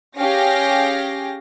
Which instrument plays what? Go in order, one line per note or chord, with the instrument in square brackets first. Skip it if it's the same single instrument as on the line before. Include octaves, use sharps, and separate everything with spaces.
[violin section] C#4 G4 G#4 F5 G5 A#6